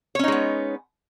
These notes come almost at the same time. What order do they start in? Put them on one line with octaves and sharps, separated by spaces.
C#5 C#4 D#4 G#3 B3